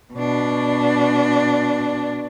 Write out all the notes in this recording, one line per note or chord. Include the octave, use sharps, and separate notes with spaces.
B2 D4